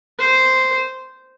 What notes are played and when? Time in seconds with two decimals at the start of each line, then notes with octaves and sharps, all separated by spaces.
0.19 C5